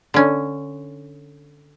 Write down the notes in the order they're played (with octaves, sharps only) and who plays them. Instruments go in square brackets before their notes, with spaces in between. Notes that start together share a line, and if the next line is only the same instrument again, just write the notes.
[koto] D3 C#4